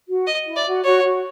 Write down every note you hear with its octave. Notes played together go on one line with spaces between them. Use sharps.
F#4
D#5
E4
D5
F#4
F#4 C#5
F#4